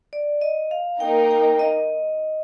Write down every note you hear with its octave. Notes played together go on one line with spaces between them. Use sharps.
D5
D#5
F5
A#3 D#4 A#4 G5
G5
D#5